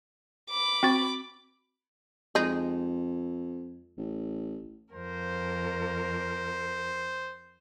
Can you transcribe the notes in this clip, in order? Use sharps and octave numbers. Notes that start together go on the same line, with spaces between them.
B5 D6
C4 F#4 A6
F2 G#3 D#4
A1
F2 A#4 C5